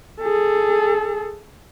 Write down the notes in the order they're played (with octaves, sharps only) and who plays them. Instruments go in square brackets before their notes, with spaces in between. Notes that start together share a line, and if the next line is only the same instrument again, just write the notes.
[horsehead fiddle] G#4 A4